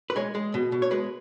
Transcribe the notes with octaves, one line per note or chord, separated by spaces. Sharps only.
B4
G#3 C#5
G#3
B2
B2
C#5
G#3 B4